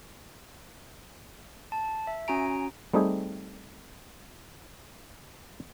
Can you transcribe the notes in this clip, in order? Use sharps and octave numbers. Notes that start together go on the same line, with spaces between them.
A5
E5
C#4 F#4 G#5 A#5 D7
G3 A3 C4 D#4 G4 G#4